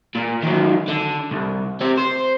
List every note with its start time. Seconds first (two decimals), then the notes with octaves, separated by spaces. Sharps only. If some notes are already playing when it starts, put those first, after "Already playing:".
0.15 A#2
0.43 D#3 F#3
0.88 D3
1.31 C2
1.81 C4 G4
1.97 C5